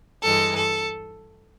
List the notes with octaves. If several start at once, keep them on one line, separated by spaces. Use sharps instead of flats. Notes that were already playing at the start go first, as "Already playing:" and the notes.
G2 E3 G#3 A4
A4